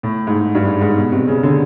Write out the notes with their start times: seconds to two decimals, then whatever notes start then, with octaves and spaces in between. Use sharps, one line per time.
0.03 A2
0.27 G#2
0.55 G2
0.66 G#2
0.81 G#2
0.96 B2
1.12 C3
1.28 C#3
1.43 D3